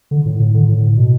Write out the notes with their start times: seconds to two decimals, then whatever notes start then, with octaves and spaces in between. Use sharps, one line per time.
0.11 D3
0.26 A2
0.40 A2
0.54 D3
0.69 A2
0.97 B2